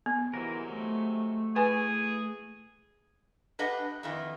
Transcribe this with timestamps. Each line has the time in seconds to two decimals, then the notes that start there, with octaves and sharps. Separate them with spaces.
0.06 B3
0.34 G#2 C3 E3 F#3 A#4
0.71 A3
1.56 E3 G#4 B4 G#5
3.59 D4 G4 B4 D#5 F#5
4.03 F2 D#3 E3